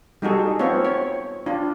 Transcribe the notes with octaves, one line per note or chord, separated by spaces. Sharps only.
G3 D#4 F#4 G#4 A4
B3 C4 F4 C#5
C#5
D4 F4